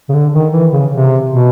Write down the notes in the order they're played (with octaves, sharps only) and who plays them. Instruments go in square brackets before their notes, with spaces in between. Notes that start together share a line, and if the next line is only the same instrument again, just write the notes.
[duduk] C#3
D3
D#3
E3
C#3
C3
B2